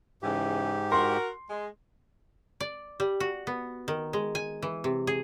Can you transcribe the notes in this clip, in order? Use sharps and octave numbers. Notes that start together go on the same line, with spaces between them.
G#2 C#3 E3 G4
F#4 A#4 C6
G#3
D5
G3
F#4
B3
D#3
G#3
G#5
E3
C3
G#4